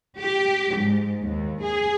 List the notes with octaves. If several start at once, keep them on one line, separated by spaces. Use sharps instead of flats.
G4
G#2
D#2
G#4